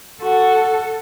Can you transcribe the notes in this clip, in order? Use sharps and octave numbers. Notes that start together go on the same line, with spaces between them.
F#4 A4